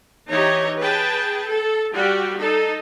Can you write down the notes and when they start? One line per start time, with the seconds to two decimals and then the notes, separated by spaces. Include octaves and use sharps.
0.30 E3 D#4 G4 C#5 D#5 A#5
0.79 G#4 B4 G5 A5
1.47 A4
1.94 G3 F#4 G4
2.37 D#4 A4